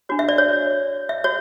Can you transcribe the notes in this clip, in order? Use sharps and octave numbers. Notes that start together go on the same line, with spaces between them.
D4 F#4 C#5
E5
D5
C#5
E5
F#4 C#5